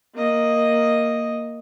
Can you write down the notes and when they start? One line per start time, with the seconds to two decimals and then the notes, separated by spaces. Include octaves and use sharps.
0.15 A#3 D#5